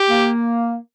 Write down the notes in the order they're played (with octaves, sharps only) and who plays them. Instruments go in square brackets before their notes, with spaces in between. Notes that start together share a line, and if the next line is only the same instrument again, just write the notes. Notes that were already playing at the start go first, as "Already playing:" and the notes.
Already playing: [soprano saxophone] G4
[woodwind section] A#3